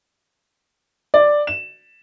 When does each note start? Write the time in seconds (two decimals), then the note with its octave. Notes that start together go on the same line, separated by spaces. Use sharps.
1.14 D5
1.47 E7